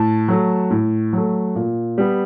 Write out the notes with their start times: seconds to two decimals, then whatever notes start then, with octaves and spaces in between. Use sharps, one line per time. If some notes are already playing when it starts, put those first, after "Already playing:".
Already playing: A2 A5
0.28 F#3 A3
0.70 A2
1.13 F#3 A3
1.55 A#2
1.98 G3 B3